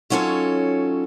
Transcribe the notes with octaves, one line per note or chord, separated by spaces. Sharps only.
D#3 F#3 C#4 F4 A4 C#5